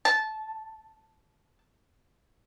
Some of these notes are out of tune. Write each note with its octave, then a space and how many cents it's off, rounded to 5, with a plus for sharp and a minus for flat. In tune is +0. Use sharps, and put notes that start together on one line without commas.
A5 -15